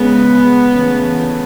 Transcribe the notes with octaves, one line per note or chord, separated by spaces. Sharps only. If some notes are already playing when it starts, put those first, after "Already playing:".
Already playing: C#3 G#3 B3
C#3 E3 A3